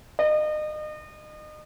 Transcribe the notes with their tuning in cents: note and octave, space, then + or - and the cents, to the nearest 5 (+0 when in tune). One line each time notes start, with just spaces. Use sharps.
D#5 -35